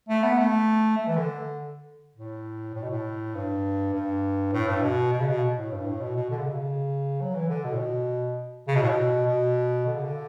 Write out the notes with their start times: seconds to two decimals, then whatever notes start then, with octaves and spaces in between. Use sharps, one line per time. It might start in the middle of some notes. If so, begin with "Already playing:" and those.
0.09 A3
0.23 B3
0.38 A3
0.97 A3
1.07 E3
1.17 D3
2.16 A2
2.74 A2
2.82 B2
2.90 A2
3.35 G2
3.93 G2
4.52 A2
4.67 G2
4.82 B2
5.12 B2
5.20 C#3
5.28 B2
5.56 A2
5.72 G2
5.86 A2
6.01 B2
6.16 B2
6.30 D3
6.38 C#3
6.46 B2
6.54 C#3
7.21 F#3
7.35 E3
7.49 D3
7.64 B2
7.73 A2
7.78 B2
8.68 C#3
8.75 B2
8.82 A2
8.89 B2
9.26 B2
9.86 D3
9.95 C#3
10.04 D3